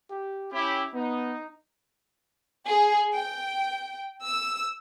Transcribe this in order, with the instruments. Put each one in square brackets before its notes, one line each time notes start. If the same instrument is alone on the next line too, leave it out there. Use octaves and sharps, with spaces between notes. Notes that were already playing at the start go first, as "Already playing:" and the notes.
[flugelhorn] G4
[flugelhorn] C#4 [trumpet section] E4 G4
[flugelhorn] B3 [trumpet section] D#4
[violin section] G#4
G5
E6